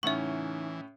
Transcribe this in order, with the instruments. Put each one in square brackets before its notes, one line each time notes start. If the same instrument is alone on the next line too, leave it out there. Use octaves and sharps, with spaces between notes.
[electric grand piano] A2 C#4 [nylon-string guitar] C#3 D#4 F#5 [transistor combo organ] E3 [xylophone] E5 C#6